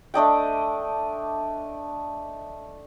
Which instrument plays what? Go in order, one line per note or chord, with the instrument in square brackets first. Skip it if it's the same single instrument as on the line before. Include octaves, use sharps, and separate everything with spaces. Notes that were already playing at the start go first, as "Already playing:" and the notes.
[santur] A3 D4 D#5 G5